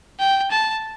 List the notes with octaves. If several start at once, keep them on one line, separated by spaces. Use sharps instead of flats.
G5
A5